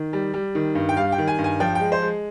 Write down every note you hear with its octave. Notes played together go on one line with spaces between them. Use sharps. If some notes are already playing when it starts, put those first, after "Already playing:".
Already playing: D#3
G3
G3
D#3
G2
G5
G3 F5
G5
D#3
G#5
G2
G#5
F3 G5
G#3 G5
C5
G#3